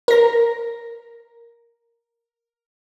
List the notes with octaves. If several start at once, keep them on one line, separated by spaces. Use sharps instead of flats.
A#4 A#6